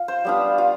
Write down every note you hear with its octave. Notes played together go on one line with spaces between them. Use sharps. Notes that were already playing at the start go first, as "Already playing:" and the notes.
Already playing: F4
C5
G3 B3 D4 F4
F4